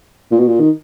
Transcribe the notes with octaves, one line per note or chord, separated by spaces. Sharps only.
A#2
B2
A#2
D#3